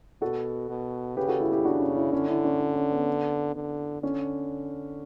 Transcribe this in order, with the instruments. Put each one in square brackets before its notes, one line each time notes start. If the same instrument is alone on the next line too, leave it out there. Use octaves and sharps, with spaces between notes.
[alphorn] B2 [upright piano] F#4 A4
[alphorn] B2
[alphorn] C#3 [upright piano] G4 B4
[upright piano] F#4 A4
E4 G4
E4 G4
D4 F#4
C#4
C#4 E4
[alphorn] D3 [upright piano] C#4 E4
[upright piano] C#4 E4
C#4
C#4
C#4
B3
[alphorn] D3
[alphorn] D3 [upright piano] C#4